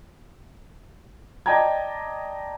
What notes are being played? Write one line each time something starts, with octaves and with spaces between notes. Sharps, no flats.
D5 D#5 G5 A5 A#5 G#6